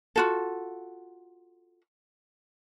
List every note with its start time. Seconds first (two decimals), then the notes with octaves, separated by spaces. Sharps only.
0.16 F4 F#4 A4